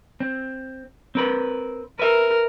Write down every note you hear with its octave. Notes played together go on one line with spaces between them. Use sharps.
C4
C4 A#4 B4
A#4 B4 E5